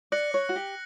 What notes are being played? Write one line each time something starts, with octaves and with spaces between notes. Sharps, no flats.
D5 F#6 A#6 C#7 F#7
C#5
F#4
G4